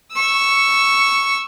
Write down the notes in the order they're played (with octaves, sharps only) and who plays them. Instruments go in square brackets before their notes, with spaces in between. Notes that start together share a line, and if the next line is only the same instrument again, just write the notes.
[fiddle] C#6 E6